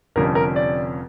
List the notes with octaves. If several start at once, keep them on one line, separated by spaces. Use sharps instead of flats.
F1 F2 D3 G3 C#4 A#4
A#4
D5